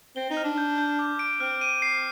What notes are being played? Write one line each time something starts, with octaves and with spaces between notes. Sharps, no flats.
C4 G7
D#4
F6
D4
G6
G6
D6
D7
C4 F6
D#7
C7